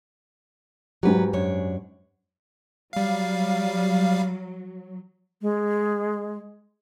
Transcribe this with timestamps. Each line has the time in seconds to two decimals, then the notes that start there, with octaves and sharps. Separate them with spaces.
1.03 G#2 F#3 F#4 G4 B4
1.33 F#2 D4 C#5
2.93 F#3 G3 F5
5.42 G#3